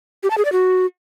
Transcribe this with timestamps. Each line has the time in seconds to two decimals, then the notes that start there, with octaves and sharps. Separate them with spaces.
0.23 G4
0.30 A5
0.38 G#4
0.45 D5
0.52 F#4